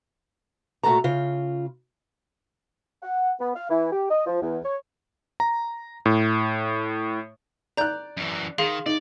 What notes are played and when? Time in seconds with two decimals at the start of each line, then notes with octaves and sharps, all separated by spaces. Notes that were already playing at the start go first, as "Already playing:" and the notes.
0.83 A#2 A3 F#4 A4 A#5
1.04 C#3 F4
3.02 F#5
3.39 B3
3.56 F5
3.70 E3
3.92 G4
4.10 D#5
4.26 F3
4.42 E2
4.64 C#5
5.40 A#5
6.06 A2
7.77 D5 A#5 F#6 G6
8.17 F#2 E3
8.58 D#3 G#4 F5 C6
8.86 D#4 D5